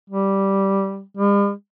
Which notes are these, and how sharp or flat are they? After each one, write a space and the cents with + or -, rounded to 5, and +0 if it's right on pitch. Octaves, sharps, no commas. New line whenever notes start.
G3 -5
G3 +45